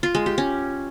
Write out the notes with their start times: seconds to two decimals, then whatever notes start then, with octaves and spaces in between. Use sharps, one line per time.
0.03 F4
0.15 G#3
0.26 G4
0.38 C#4